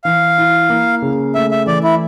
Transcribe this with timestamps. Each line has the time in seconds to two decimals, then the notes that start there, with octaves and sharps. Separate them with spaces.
0.04 E3 F5
0.38 E4
0.70 A#3
1.02 C#3
1.35 A3 E5
1.51 E5
1.66 E3 D5
1.84 E4